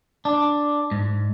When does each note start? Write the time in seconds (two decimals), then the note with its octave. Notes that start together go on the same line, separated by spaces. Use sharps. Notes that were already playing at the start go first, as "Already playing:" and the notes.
0.25 D4
0.91 G#2